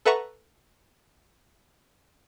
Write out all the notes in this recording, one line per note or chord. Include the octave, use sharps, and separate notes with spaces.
A4 B4 E5 F#5 A#5 C#6